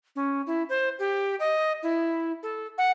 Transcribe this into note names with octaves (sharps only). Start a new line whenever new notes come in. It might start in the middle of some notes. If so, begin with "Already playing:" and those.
C#4
E4
C5
G4
D#5
E4
A4
F#5